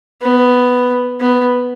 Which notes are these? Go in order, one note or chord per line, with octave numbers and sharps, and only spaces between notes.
B3
B3